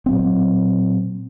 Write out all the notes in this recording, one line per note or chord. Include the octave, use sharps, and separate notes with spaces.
A#2 F#3 C4